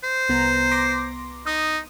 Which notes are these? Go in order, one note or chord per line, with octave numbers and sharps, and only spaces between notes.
C5
C2 B3 A#5
C6 D6 A#6
D#4 D#6